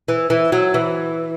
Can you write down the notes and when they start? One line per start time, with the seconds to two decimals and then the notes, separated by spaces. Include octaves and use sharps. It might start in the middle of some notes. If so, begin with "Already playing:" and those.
0.08 E3
0.30 E3
0.52 F#3
0.74 E3